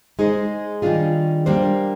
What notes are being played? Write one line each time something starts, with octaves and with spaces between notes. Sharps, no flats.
G#3 D#4 G#4 C5
D#3 G3 D4 F4 G#4
G3 A#3 D4 G4 C5